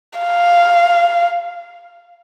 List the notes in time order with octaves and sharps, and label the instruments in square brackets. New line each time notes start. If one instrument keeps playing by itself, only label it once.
[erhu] F5